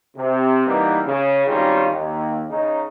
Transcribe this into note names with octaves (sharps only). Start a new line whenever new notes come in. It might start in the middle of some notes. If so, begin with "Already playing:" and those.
C3
E3 G3 A#3 B3 D#4
C#3
G#1 D#3 G3 C#4 F4
D#2
C#3 D#4